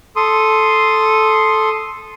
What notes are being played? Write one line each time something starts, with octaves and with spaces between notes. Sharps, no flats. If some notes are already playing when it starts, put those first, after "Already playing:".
A4 C6 D#6